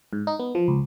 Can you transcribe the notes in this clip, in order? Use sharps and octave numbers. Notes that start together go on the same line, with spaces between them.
G#2
D#4
B3
F3
C#2